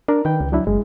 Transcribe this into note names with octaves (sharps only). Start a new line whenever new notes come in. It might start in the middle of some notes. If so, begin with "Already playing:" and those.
D4 A#4
D#3 B4 G5
C#2
F#3 D4 E4
F#1 G#3